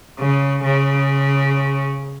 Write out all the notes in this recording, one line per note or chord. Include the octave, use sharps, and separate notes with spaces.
C#3
C#3